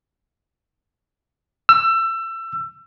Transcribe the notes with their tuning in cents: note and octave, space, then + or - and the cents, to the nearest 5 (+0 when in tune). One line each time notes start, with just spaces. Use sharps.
E6 +25